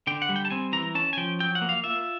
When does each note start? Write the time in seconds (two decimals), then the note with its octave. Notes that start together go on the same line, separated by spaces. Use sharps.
0.07 D3 G5
0.22 F#5
0.29 G3
0.36 G5
0.45 A5
0.50 C4 G#5
0.73 E3 A#5
0.95 C#4 A5
1.13 G#5
1.17 F3 G5
1.40 F#3 G5
1.55 F#5
1.62 A#3
1.69 F5
1.84 F4 E5